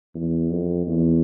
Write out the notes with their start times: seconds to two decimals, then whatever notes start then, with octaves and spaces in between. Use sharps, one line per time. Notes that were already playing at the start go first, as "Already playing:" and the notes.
0.15 E2
0.51 F2
0.87 E2